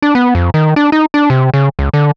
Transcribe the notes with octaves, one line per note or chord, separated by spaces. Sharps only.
D4
B3
F2
D#3
D4
D#4
D4
C3
C#3
C#2
D3